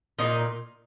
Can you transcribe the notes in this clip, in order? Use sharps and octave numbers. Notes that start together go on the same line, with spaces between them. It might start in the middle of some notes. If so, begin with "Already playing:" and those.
A#2 D#4